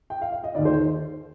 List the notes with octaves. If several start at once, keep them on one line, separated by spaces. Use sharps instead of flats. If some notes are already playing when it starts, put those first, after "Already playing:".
G5
F5
F5
D#5
D#2 D#3 D5
C5
C5